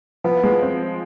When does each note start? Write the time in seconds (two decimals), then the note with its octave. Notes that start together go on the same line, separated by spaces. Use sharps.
0.24 F3 B3
0.44 G#3
0.62 C4